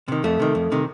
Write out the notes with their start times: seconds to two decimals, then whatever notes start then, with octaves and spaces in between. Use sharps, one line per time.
0.08 C3 D#3
0.24 F2 A3
0.39 C3 D#3
0.55 F2
0.72 C3 D#3